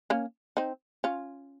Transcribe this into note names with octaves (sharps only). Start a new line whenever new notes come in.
A#3 C#4
C4 D#4
C#4 F4